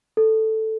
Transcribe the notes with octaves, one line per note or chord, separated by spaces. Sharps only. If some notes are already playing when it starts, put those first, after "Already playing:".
A4